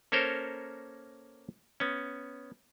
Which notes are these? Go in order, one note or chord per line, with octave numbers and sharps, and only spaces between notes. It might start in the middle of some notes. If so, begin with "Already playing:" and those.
A#3 C#4 A4 A#4 C5 C#5
B3 C#4